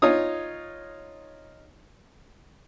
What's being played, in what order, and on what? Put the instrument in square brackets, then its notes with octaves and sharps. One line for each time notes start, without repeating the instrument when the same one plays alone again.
[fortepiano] D#4 F4 C#5 D#6